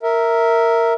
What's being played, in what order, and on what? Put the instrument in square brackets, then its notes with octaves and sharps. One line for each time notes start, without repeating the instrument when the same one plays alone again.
[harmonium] A#4 E5